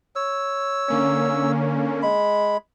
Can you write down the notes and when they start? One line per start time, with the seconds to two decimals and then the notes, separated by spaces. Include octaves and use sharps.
0.16 C#5 E6
0.88 D3 A#3 C#4
2.02 G#3 B5